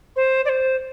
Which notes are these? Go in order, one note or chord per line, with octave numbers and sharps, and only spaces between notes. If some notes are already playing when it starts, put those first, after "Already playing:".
C5
D5
C5